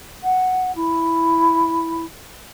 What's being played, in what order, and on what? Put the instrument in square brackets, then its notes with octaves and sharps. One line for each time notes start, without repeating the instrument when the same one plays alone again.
[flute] F#5
E4